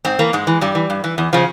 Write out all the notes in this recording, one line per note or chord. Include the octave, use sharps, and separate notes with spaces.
G#2 C4
E3 A#3
G#2 G#3
E3
G2 G3
E3
G2
E3
E2
C#3 F3